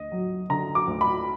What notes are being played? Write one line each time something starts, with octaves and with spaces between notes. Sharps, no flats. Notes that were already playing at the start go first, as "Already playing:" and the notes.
Already playing: D2 D#5
F#3
D3 A#5
D6
D2
B5